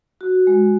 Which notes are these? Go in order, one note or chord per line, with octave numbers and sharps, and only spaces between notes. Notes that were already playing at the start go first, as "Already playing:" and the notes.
F#4
G#3